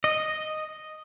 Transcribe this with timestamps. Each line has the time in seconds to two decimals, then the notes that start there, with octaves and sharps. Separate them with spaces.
0.04 D#5